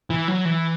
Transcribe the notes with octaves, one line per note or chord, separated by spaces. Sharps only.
E3
F#3
E3